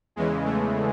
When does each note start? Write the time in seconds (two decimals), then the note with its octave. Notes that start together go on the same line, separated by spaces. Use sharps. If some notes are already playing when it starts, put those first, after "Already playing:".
0.16 E2 C#3 E3 G#3
0.45 A3